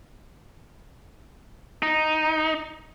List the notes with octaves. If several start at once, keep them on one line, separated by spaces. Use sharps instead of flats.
D#4